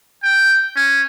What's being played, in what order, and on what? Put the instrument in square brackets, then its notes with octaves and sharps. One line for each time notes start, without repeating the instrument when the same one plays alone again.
[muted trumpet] G5
C#4